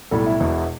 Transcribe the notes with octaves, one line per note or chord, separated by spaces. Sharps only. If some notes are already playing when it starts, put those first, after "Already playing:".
B1 A2 G3 A4
E4
E1 E2 B2